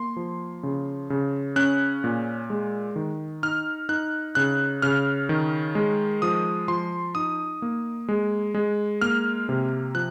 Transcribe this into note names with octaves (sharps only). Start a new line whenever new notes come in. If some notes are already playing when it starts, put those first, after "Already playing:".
Already playing: A#3 C6
F3
C#3
C#3
C#4 F#6
A#2
G#3
D#3
D#4 F6
D#4 F#6
C#3 F#6
C#3 F6
D#3
G#3
F3 D#6
F3 C6
D#4 D#6
A#3
G#3
G#3
A#3 F6
C3
F3 F#6